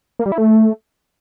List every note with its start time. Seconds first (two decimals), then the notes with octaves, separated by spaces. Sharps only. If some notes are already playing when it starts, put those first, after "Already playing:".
0.19 A#3
0.26 G3
0.32 E4
0.38 A3